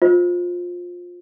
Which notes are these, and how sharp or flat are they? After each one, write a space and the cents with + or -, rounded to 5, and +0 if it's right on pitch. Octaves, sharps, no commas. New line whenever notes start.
F4 +20 C5 +0 D#5 +0